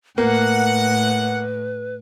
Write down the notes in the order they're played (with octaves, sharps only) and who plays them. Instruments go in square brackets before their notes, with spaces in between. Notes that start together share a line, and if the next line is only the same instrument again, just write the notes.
[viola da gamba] A2 [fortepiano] A#3 [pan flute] B4 [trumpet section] F#5